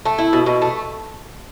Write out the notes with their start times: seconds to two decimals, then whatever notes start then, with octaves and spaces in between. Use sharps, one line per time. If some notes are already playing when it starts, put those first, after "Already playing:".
0.05 A3
0.18 E4
0.33 B2
0.46 B2
0.62 A3